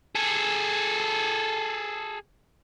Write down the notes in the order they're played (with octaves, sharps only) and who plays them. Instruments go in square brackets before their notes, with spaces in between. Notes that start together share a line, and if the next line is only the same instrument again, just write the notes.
[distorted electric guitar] G#4 A4